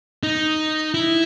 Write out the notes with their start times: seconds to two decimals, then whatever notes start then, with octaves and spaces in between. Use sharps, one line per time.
0.23 D#4
0.94 E4